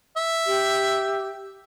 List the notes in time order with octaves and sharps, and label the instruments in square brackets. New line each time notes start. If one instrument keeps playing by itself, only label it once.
[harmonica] E5
[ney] G4